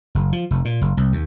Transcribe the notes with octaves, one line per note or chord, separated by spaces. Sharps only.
F#1
F3
F1
A#2
F#1
C2
D#2